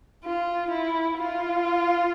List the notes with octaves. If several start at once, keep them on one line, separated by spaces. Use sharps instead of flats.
F4
E4
F4